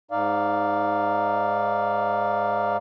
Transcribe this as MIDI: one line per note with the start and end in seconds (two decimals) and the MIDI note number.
0.11 2.77 44
0.11 2.77 63
0.11 2.77 74
0.11 2.77 77